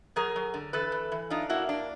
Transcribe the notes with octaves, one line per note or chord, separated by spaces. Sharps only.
F#3 G#4 A#4
F#3
D3
E3 A4 B4
E3
E3
D4 D#4 F4
A#3 E4 F#4
D4